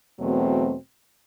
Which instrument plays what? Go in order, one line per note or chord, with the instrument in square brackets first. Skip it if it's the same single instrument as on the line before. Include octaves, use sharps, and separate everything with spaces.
[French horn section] E2 B2 F#3 A3 C4